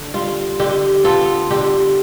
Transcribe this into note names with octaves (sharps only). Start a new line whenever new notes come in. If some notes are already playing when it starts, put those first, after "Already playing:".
Already playing: D3
G3 F4
D3 G4
B3 F4 A4
D3 G4